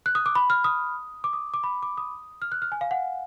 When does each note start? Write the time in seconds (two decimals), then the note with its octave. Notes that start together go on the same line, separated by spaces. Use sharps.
0.06 F#6
0.15 D#6
0.26 D6
0.35 B5
0.50 F6
0.64 D#6
1.24 D6
1.33 D#6
1.54 D6
1.64 B5
1.83 D6
1.98 D#6
2.42 F6
2.52 F#6
2.62 F6
2.72 G#5
2.81 F5
2.91 F#5